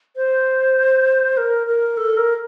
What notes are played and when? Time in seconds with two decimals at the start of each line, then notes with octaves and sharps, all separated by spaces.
0.16 C5
1.37 A#4
1.67 A#4
1.97 A4
2.17 A#4